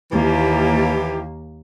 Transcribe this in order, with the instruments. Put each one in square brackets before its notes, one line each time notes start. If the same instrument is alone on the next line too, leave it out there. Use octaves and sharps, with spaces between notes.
[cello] D#2 A#3 [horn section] E3 E4 G4